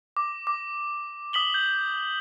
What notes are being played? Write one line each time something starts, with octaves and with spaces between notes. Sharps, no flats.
D6
D6
D#6 B6 F#7 G7
G6